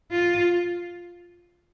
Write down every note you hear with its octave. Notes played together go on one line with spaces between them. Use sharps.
F4